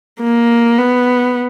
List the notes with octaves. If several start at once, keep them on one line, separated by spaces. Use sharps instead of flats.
A#3
B3